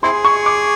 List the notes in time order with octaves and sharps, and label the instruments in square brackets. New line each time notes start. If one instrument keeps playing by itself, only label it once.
[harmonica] C4 E4 G#4 [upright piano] C6
[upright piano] C#6
D6